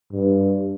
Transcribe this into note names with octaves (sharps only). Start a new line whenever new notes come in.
G2